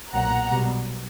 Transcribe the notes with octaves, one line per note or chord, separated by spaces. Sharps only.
B1 A#2 F#3 F#5 A#5
B1 B2 G3